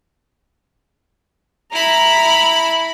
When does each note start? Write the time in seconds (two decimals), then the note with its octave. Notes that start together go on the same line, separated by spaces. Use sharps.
1.73 E4 A#5 B5